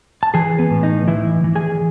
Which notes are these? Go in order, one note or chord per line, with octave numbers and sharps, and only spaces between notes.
A5
E3 G#4 G#5
B3 B4
A2
D#4 D#5
E3 E4 E5
E3
G#4 G#5